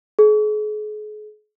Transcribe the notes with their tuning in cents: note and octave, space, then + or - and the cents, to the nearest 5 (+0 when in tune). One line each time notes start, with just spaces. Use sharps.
G#4 +40